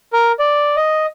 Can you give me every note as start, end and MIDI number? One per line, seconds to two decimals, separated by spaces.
0.13 0.32 70
0.39 0.76 74
0.76 1.06 75